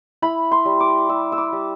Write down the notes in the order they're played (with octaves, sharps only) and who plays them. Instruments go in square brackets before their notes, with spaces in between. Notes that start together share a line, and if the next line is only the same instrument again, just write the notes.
[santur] E4 B5
C6
G3
D6
G3 E6
E6
D6
G3